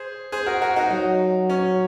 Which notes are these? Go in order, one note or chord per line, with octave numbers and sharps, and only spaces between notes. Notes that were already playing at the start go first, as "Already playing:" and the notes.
Already playing: G#4 C5
G#4 C5
F#4 A#4
F#4 A#4
D#4 F#4
F#3 D#4
C#4